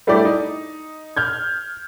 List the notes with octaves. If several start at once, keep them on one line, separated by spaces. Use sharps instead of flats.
G3 A3 D4 E4 G4 D5
D#4
F6 G6 G#6